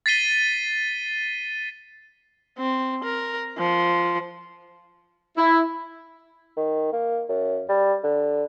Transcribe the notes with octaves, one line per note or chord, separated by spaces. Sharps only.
A6 B6 C7 D#7 G7
C4
A#4
F3
E4
D#3
A#3
F#2
G3
D3